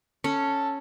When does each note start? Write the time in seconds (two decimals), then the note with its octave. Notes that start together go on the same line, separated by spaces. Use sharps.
0.24 C#4 A4